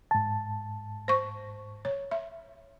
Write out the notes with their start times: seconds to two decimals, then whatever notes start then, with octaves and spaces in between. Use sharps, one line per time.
0.11 G#2 A5
1.08 C5 C#6
1.85 C#5
2.11 E5